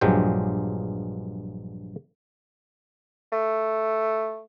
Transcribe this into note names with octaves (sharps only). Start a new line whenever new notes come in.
A#1 G2 F3 F#3 G#3 G5
A3